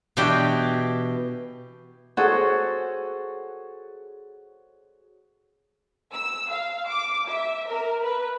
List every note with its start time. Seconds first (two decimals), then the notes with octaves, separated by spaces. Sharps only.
0.17 B2 E3 D4 G4 G5
2.17 F#4 G#4 A4 C5 C#5 F#5
6.13 E6
6.50 F5
6.88 D6
7.28 E5
7.69 A#4
8.03 B4